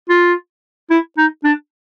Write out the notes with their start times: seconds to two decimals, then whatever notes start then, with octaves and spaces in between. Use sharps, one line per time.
0.09 F4
0.90 E4
1.17 D#4
1.44 D4